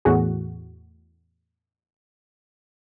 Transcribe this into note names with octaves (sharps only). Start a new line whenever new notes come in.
E2 A2 F#4 G#4